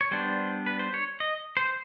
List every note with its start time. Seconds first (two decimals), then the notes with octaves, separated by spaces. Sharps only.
0.01 C#5
0.11 G3 B3 D4 C5
0.66 B4
0.79 C5
0.94 C#5
1.20 D#5
1.57 C5